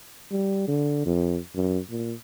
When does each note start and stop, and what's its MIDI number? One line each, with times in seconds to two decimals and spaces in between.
0.31 0.64 55
0.68 1.02 50
1.06 1.38 41
1.55 1.78 42
1.90 2.13 46